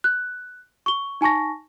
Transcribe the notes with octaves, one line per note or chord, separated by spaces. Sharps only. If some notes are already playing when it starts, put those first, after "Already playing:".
F#6
C#6 G7
D#4 G#5 A5 C#6 A#6